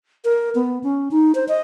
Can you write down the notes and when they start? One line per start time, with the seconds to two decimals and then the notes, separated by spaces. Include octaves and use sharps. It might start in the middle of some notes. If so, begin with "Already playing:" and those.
0.25 A#4
0.55 B3
0.84 C#4
1.11 D#4
1.35 C5
1.48 D#5